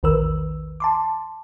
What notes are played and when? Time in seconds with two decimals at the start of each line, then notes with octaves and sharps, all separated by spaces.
0.03 A#1 E2 D#3 A#4 B4 E6
0.80 A5 C6 D6